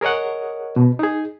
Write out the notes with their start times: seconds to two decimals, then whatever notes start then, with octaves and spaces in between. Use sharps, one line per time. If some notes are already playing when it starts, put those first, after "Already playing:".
0.01 G#4 A#4 C#5 D#5 F#5
0.76 B2
0.99 D#4 G#4